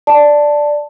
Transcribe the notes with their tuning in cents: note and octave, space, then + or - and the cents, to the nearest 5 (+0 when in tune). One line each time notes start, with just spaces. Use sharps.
D5 +0 A5 +0